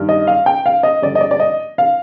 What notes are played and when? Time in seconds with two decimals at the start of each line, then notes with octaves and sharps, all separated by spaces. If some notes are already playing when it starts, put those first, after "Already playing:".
Already playing: G2 D#3
0.09 D#5
0.27 F5
0.46 G5
0.66 F5
0.83 D#5
1.02 G2 D3 D5
1.15 D#5
1.21 D5
1.31 D5
1.40 D#5
1.78 F5